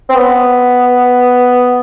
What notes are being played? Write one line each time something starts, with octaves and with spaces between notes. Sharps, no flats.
C4
B3